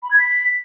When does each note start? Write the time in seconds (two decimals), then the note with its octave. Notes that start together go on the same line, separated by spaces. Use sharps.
0.02 B5
0.10 G#6
0.18 B6